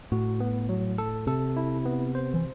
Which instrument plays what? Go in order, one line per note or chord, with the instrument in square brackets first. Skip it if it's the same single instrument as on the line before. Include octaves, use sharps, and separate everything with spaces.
[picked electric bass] A2 [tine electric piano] F#4
[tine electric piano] B3
F#3
A4
[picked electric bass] C3 [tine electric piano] A4
[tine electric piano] E4
B3
C5
[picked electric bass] E3